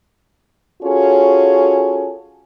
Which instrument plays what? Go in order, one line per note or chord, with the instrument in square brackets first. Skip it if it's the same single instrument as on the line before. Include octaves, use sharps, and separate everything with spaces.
[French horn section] C#4 F4 F#4 G#4 A4 C#5